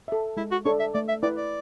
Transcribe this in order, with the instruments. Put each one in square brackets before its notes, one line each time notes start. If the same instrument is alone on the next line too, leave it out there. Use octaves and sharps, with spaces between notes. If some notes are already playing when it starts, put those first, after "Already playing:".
[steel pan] A4 E5
[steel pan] G#3 [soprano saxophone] E4
[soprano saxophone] F#4
[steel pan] D4 A4 [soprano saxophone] C#5
[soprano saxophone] E5
[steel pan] A3 [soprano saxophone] D5
[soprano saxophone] E5
[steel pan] E4 B4 [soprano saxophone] D5
[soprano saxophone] D5